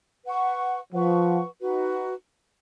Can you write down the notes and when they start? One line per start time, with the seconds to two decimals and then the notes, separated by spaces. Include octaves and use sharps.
0.25 B4 F#5 C#6
0.93 F3 B4 F#5 C#6
1.60 D#4 F#4 B4